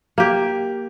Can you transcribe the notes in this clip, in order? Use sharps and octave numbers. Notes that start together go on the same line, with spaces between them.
A#3 G4